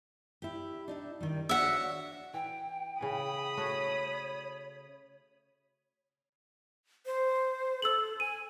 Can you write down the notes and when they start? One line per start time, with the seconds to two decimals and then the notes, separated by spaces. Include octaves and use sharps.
0.42 E4 G4
0.88 D4 D#4 E5
1.21 D#3 G3
1.49 D4 F#4 C#5 E5 F#5
2.34 E3 G5
3.01 C#3 E3 B5 D#6
3.57 A3 F#4 C#5
7.06 C5
7.82 A4 E6 F#7
8.20 G#5 D#7